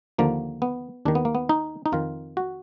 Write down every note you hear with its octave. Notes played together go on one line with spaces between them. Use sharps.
D#2 D3 F3 A#3
B3
D#2 D#3 D4
B3
A#3
B3
D#4
D#4
F2 D#3 F4
F#4